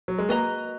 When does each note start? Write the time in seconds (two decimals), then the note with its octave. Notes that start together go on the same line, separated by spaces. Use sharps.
0.08 F#3
0.18 G#3
0.28 A#3 F#4 B4 D#5 A#5